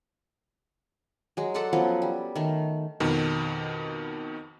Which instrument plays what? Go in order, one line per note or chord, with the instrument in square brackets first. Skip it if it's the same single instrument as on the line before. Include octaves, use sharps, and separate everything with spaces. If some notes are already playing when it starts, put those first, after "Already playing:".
[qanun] F#3 G#3
A4 D5 F#5 C6
F3 F#3 B3 C#4
G3
D#3 A3
[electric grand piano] F2 B2 D#3